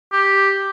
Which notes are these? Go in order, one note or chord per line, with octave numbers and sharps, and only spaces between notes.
G4